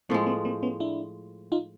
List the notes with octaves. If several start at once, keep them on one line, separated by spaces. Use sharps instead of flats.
A2 F3 G#3 A#3 C4
A#3 C4
A#3 C4
B3 C#4
D4 E4
D#4 F4